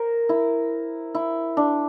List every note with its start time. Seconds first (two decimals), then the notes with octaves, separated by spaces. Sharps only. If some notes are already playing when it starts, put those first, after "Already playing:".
Already playing: A#4 C5
0.29 E4
1.15 E4
1.57 D4